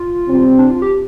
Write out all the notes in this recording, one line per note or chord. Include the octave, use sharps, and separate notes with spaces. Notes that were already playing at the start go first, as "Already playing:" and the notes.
Already playing: F4
C3 G3 C4
D4
F4
G4